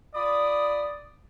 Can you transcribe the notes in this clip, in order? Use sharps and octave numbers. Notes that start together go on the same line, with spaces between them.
F4 D5 B5 D#6